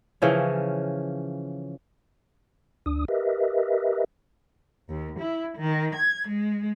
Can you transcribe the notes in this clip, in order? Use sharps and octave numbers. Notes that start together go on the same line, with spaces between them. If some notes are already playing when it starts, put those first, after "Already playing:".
C#3 E3 F3 C#4
D2 D4 D#6
G4 A#4 B4 D#5 E5
D#2
E4
D#3
G#6
G#3